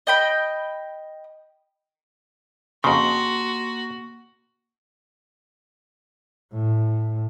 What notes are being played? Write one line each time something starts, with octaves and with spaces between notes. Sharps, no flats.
D#5 G5 B5
F2 C#3 A#3 F#4 C6
A2